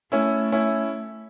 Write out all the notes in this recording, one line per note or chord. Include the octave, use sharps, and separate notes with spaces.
A3 C#4 E4
C#4 E4